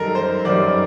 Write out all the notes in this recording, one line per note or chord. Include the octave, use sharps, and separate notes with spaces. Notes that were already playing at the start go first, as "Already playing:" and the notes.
Already playing: F#2 D#3 G3 A4 A#4
C5
F#2 D#3 G3 D5